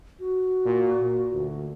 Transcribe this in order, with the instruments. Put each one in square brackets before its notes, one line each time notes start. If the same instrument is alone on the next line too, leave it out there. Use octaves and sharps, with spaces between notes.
[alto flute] F#4
[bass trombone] A#2
A#2
D2